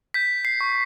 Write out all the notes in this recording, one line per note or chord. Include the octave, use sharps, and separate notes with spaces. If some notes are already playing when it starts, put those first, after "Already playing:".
G6 B6
C7
C#6